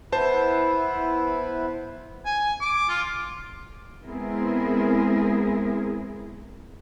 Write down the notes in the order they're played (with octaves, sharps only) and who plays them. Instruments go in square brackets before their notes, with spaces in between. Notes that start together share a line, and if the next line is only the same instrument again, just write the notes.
[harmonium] B3 E4 B4 [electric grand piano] C5 A5
[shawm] G#5
D6
F4
[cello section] G#3 B3 C4 E4 G#4 A#4